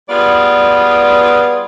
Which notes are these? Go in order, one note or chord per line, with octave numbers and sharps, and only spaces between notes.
G3 B3 F4 G#4 B4 D5